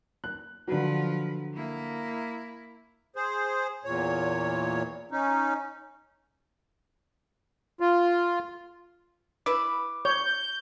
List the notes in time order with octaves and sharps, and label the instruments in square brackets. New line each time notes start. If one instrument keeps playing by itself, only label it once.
[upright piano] F#6
[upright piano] D3 F#3 [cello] F3 B4
[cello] A#3 E4
[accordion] G#4 C5
E2 A#2 C#5
C#4 D#4
F4
[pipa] E4 B4 [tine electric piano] D6
[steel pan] C#5 [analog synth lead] G6